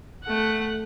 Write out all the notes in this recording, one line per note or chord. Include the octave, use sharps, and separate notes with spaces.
A3 F#5